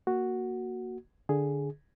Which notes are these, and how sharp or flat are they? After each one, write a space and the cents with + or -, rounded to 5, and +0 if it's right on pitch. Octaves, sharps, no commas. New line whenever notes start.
A#3 +0 F#4 +0
D3 +0 G#4 +0